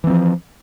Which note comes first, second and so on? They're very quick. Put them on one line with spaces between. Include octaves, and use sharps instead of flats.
E3 C4 F3